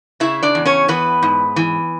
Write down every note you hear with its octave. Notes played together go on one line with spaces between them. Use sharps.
C#3 E4 E5
D4 D5
E2
C#4 C#5
E3 B3 B4
G#2
E3